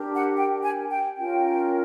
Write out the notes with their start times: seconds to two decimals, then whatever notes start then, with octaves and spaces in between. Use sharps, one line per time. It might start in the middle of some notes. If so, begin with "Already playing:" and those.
Already playing: D4 G4 A#4
0.15 F#5
0.35 G5
0.62 G#5
0.91 G5
1.18 C#4 F4 A#4 G5